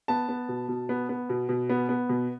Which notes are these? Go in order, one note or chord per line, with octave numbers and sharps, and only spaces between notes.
B3 A5
B3
B2
B2
B3
B3
B2
B2
B3
B3
B2